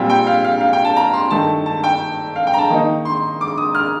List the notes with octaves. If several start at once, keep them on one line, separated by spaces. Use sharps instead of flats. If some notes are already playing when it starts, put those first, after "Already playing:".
Already playing: A#2 G3 C4 F4
G5
F5
F5
F5
G5
A5
A#5
C6
G2 D#3 A3 A5
A5
G5
F5
G5
A#5
A5
D#3 A#3 D#4
C6
D6
D#6
F6